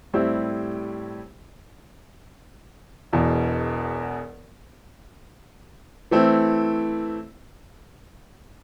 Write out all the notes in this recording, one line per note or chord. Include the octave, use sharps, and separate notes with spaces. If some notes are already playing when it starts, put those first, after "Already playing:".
A2 G3 C4 E4 G4
E1 E2 B2
E3 A3 C4 E4